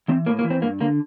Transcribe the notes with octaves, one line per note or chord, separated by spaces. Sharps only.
E3 C4
A2 A#3
A#3
E3
C4
G2 A#3
D3 A#3